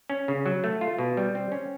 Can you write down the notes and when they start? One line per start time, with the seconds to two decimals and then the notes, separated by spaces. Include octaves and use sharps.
0.10 C#4
0.28 C#3
0.46 F#3
0.64 A3
0.81 F4
0.98 B2
1.17 G3
1.35 C4
1.52 C#4